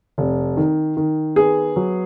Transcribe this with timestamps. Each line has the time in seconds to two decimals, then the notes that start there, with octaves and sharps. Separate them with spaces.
0.18 F1
0.57 D#3
0.97 D#3
1.36 B3 G#4
1.76 F#3